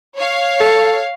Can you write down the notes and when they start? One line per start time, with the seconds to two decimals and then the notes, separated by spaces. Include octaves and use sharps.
0.16 C#5 F5
0.60 A4